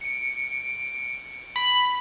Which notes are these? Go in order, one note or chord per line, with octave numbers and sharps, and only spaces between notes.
C#7 D7
B5